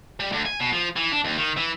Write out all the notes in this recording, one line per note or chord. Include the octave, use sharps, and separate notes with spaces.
G3
D2
G#5
B2
F3
E3
D4
D#2
D#3
E3